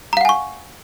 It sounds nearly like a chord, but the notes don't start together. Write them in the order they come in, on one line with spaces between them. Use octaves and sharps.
A#5 F5 F#5 G#5 C#6